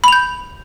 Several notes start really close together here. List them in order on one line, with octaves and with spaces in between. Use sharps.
B5 F7 G6